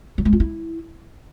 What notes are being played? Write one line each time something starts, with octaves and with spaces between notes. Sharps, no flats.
F#3
G#3
F4
E4